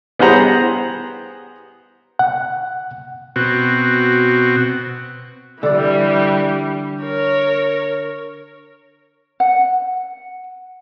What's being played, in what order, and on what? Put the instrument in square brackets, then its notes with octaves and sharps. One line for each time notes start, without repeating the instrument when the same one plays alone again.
[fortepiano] B3 G4 G#4 C5 F#5 A#5
[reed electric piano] F#5
[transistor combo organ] B2 C4 F#4
[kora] D3 D5 [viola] E3 G3
[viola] A#4 C#5
[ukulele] F#5